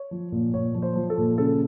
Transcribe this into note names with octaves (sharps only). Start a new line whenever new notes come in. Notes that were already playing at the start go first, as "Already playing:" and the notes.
Already playing: C#5
F3
A#2
A#2 C#5
F3
C5
F3
A4
A#2
C#3 A4